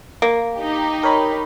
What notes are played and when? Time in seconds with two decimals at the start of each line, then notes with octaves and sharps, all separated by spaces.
0.22 A#3
0.56 D#4 G4
1.03 A#4 C#5 B5